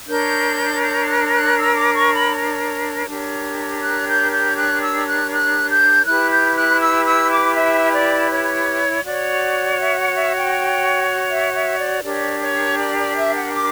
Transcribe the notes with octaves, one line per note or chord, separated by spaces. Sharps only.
D4 A#4 C#5 G6
G6
F#6
F#6
E6
D6
C#6
B5
D4 G4 A#4 C#5
F#6
G6
G6
F#6
E6
F#6
F#6
G6
E4 G4 B4 F#6
G6
F#6
E6
E6
D6
E5
D5
C#5
F#4 C#5 D5
E5
F#5
E5
G5
E5
E5
D5
D4 G4 A#4 C#5 D5
C#5
D5
D5
E5
F#5
D6